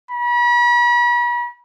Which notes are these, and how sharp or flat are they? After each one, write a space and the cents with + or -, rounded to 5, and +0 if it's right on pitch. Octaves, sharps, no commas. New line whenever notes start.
B5 -40